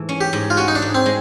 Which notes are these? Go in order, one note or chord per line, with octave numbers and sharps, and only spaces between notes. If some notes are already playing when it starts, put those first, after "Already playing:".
Already playing: G#2 E3 A3
C#4
G4
G#2
F4
C#4 F#4
D#4
D4
G#2
C4
G#3